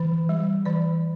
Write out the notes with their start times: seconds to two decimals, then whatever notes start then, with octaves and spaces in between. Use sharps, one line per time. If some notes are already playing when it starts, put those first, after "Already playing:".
Already playing: E3
0.29 G3
0.66 E3 D5